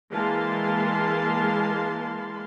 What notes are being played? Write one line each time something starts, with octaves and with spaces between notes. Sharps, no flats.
E3 G#3 A#3 F5 A5 C6